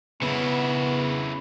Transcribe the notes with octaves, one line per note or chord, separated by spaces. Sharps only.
C#3 B3 E4